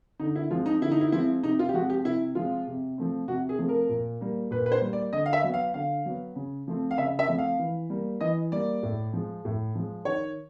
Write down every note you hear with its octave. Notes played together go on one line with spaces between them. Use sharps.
D3 D#4
E4
F3 G#3 C4 F4
D#4
D3 E4
D#4
E4
F3 G#3 C4 E4
C3 D#4
F4
G4
F3 G#3 C4 F#4
G4
C3 E4
F3 G#3 C4 F4
C3
F3 A3 C4
C3 F#4
G#4
F3 A3 C4
A#4
A#2
G3 A#3
A#2 B4
B4
C5
G3 A#3
D5
D3 D#5
F5
E5
F#3 B3
F5
D3 F5
F#3 B3
C#3
F3 A3 C4
F5
C#3 E5
E5
F3 A3 C4
F5
E3
G3 A#3
E3 D#5
G3 A#3 D5
A2
F3 G#3
A2
F3 G#3
D#3 C#5